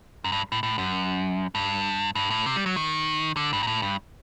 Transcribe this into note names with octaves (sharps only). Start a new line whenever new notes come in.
F#2
G2
A2
A2
F#2
G2
G2
A2
C3
G3
F#3
D#3
D3
G2
A#2
A2
G2